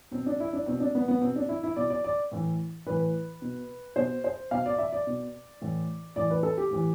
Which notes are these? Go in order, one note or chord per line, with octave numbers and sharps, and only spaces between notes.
B2 C4
D4
E4
D4
B2 C4
D4
B3
B3
B2 C4
D4
E4
E4
B2 D5
D5
D5
A2 E3
A2 E3 B4
B2
B2 C5
C5
B2 F5
D5
E5
D5
B2
A2 E3
A2 E3 D5
B4
A4
G4
A2 E3